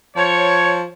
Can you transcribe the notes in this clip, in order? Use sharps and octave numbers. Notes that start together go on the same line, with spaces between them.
F3 C#5